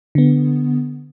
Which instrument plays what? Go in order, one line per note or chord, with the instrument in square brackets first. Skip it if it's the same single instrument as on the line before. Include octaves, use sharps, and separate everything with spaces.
[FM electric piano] D3 B3